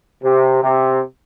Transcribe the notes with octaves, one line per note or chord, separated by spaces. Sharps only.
C3
C3